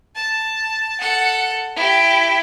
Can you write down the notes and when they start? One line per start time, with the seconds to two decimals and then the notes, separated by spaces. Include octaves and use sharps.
0.15 A5
1.00 A4 F#5
1.76 E4 G4